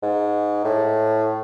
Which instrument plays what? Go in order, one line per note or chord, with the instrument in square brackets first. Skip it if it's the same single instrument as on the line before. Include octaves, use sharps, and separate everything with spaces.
[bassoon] G#2
A2